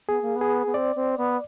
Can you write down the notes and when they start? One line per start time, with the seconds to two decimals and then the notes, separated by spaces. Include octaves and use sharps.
0.08 B3 G#4
0.22 A#3
0.36 B3
0.41 G#4
0.66 B3
0.74 C4 D5
0.96 C4
1.17 B3